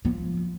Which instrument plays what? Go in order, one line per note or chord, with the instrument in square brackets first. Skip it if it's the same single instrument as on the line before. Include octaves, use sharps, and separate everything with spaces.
[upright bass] F3